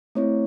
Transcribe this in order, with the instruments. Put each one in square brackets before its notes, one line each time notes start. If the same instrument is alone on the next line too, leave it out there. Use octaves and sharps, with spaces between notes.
[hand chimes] A3 C4 E4 C#5